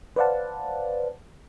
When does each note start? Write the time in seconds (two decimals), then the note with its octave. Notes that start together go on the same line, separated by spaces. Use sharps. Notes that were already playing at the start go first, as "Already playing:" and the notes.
0.16 B4 C5 D5 F5 F#5 A5